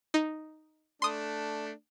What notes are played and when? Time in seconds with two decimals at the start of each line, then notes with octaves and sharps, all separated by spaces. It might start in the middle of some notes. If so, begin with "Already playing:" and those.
0.14 D#4
1.02 A3 D4 C6 D#6